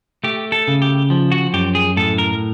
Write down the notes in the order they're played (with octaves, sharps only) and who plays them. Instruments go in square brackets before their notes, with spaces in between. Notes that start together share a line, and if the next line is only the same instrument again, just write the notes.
[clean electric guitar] A3 G4
A4
C#3
G4
F3
F#4
F#2 G4
G#4
A2 A4
A#4